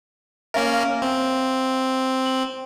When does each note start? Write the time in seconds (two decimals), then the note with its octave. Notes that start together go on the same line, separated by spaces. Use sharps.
0.54 A#3 C#4 A#4 E5 F5
1.02 C4
2.26 F#7